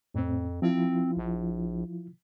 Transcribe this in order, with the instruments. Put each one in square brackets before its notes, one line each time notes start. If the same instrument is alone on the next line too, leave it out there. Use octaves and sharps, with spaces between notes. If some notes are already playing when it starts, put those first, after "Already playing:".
[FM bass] F2 [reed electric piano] A2 C4
[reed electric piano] F3 E4 F4 [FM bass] C4
[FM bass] A#1